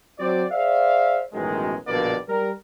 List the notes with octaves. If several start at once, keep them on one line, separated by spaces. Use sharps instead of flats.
F#3 C4 F#4 C5 D5
G#4 C5 D5 E5 F5
A1 F#2 B2 D#3 G#3
A#1 G2 B2 D3 A#3 D5
G3 A#4